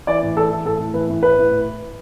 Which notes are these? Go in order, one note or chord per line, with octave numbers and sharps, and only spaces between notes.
E3 D5
A2
E3 A4
E3
A2 A4
A2
E3 B4
A2
A2 B4
A2